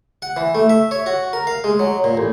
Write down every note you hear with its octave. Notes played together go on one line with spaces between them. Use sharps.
F#5
E3
A3
E5
C#5
F#4
A#4
F5
G#3
F#3
A#2
A1